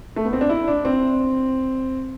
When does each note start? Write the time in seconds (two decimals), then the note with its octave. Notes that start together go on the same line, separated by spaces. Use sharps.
0.16 A3
0.25 B3
0.33 C4
0.41 D4
0.49 E4
0.68 D4
0.85 C4